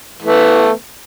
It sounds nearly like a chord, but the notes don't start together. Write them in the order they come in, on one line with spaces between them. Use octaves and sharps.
E3 A3 B3